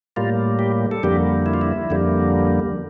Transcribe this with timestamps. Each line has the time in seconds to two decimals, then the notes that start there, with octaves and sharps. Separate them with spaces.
0.16 A2 G3 A#3 F4
0.59 G4
0.91 A4
1.03 F2 D3 G3 A#3 G4
1.46 E4
1.54 F4
1.61 E4
1.90 F2 D3 G3 A#3